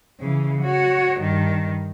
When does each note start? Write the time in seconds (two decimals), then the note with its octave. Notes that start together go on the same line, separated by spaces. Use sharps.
0.20 C#3 E3
0.62 F#4 C#5
1.20 G2 D#3